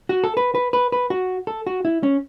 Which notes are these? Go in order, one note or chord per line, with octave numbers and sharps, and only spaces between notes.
F#4
A4
B4
B4
B4
B4
F#4
A4
F#4
E4
C#4